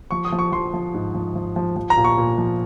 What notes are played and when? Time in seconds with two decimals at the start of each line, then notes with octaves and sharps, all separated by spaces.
0.11 F3 C#6
0.25 D#6
0.32 F3
0.39 C#6
0.52 F3 C6
0.74 F3
0.94 G#2
1.14 F3
1.35 F3
1.56 F3
1.76 F3
1.90 A#5
1.97 A#2
2.04 C#6
2.18 A#2
2.38 F3